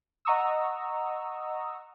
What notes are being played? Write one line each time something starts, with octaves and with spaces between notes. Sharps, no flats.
D#5 F#5 A#5 C#6 D#6 E6